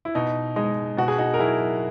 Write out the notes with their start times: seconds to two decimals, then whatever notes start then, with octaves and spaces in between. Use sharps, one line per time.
0.05 E4
0.15 B2 D#4
0.56 G#3 D#4
0.97 B2 F#4
1.08 G#4
1.18 D#4 F#4
1.34 A#4
1.39 F#3 E4 G#4